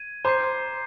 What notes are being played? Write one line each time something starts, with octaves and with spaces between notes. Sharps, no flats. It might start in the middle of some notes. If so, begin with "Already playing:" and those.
Already playing: G#6 D#7
C5 A#5 D6 G6 C7